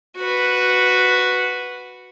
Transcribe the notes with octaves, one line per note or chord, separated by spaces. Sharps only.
F#4 B4